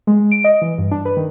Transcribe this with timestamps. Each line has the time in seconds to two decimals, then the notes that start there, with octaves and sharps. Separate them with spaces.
0.07 G#3
0.32 D7
0.44 D#5
0.62 E3
0.78 G2
0.91 D4
1.05 B4
1.17 D#3